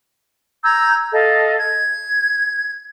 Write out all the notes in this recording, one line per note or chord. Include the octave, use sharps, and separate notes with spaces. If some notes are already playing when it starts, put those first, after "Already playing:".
A#5 E6 G6 G#6
A4 D#5 F5
G#6